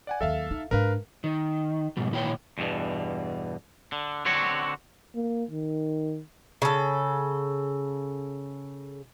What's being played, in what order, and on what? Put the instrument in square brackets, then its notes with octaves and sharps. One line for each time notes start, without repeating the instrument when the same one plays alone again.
[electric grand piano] D5 F#5 G#5
[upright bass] D#2 F#3 [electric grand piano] A4 E5 F5
[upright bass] D#4
[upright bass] G#2 D4 [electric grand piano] A#4 B4 F5
[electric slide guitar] D#3
G#2 B2 G3
A#2 D#3 E4 C#5 G5
[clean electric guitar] E2 G2 B2
D3
D3 C4 F#4 C#5
[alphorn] A#3
D#3
[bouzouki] C#3 A4